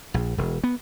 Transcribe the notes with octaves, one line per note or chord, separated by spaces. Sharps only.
A#1
E1
B3